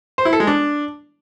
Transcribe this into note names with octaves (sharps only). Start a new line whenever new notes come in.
C5
E4
A4
G#3
D4